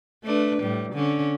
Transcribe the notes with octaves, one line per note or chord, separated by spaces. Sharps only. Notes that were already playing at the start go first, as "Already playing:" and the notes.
A3 D4 B4
A2 G3
D3 C#4